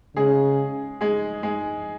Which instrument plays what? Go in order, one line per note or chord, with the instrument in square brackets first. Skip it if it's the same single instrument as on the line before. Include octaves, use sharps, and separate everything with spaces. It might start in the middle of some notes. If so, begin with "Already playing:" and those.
[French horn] C#3 [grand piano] G#3 G#4
[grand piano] G#3 G#4
G#3 G#4